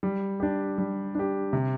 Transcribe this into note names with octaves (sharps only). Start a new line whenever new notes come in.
G3
D4 G4
G3
D4 G4
C3